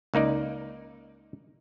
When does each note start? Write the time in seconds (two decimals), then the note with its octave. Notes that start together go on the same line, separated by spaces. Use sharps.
0.14 C#2 A#3 D#4 D5